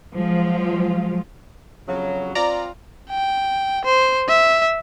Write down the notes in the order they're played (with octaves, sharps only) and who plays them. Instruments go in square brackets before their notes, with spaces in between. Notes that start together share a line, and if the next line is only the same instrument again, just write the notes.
[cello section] F3 F#3 G#3 F4
[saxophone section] F2 C#3 F#3
[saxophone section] C4 F4 [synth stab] D5 A#5
[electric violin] G5
C5
E5